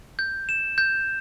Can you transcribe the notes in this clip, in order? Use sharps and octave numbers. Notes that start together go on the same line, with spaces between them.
G6
E7
G6